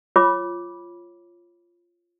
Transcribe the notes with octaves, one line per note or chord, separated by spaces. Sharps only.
F4 C#5 B5 D6